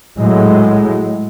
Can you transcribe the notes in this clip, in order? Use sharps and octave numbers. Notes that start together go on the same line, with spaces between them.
A2 F#3 G#3